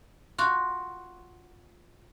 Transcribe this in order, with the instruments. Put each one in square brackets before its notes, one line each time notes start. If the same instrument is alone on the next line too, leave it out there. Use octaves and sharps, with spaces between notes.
[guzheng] F4 F#4